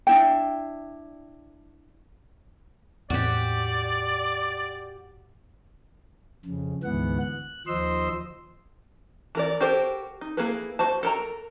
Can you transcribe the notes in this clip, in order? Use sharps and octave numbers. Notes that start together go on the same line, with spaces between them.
D4 E4 G5
E2 A2 C4 F#4 G4 D5
F2 C#3
D2 G#2 E3 B3 F#5
F#6
D#2 F3 C5 D#5 C6 E6
E3 A#4 D5
F#4 G4 A4 A#4 C5
D#4
A#3 E4 G#4 A4 B4
F#4 C5 A5
A4 A#4 A#5